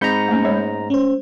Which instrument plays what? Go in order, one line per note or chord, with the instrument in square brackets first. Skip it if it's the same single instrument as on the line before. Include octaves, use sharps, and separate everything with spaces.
[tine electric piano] G#2 D#4 A#5 [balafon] C4 [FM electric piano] B5 G6 C#7
[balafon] A3 A#3 C#4
G#3 C#5
[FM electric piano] C#4 C5